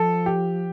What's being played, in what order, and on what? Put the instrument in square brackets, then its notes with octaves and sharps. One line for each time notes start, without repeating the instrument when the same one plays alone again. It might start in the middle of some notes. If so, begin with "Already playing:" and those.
Already playing: [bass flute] F3 [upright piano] A4
[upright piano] G4